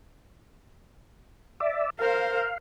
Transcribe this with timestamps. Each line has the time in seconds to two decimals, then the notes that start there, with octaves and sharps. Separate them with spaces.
1.60 D5 E5
1.99 A#4 C5 F5